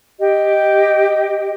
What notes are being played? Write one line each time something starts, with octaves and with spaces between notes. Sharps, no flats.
G4 D#5